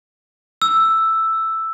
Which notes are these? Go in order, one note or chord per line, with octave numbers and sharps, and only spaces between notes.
E6